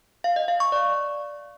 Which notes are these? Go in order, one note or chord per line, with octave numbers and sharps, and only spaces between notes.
F5
D#5
F5
C#6
D5